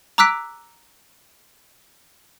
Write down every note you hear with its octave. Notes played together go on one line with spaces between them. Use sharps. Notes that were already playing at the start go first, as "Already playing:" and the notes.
A#5 D6 E6 F#6 B6 D7